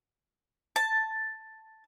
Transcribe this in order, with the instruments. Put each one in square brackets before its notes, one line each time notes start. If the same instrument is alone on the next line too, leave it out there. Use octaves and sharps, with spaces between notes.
[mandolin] A5